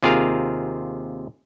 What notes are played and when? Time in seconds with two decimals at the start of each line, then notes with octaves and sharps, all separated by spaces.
0.03 D#2 C3 F4 G#4 A#4 F5